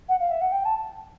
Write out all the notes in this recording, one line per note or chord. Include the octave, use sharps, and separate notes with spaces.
F#5
F5
E5
F#5
G5
A5